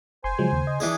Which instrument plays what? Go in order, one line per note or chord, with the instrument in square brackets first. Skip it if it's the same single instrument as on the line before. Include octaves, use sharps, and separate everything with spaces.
[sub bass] F#1 [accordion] C5 G#5 [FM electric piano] C6
[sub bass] C#3 [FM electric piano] F3 F#3 G#3
[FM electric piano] D#2
D#5
[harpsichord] E3 D4 G#4